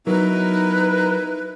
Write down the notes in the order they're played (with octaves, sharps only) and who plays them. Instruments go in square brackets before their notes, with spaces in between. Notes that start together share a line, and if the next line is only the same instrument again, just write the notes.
[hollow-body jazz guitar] F#3 [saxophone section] B3 E4 A#4 [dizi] D#4 [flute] B4